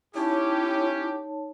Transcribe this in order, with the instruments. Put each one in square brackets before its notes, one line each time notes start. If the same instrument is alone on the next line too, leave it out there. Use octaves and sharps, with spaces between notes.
[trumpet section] C#4 G4 [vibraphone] D#4 C#5 A5 [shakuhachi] E4